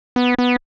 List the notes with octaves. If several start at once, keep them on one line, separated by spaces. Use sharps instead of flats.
B3
B3